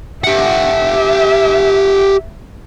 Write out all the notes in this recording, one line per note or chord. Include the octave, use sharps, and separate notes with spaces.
G4 E5 F#5